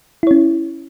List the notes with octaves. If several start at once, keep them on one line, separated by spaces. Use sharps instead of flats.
C#4 E4 C#5